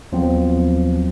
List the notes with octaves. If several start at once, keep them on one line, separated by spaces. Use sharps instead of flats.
D#2 F3 F#3 B3 C4